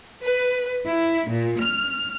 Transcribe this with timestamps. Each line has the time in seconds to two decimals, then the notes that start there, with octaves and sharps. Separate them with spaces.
0.22 B4
0.86 E4
1.30 A#2
1.61 F6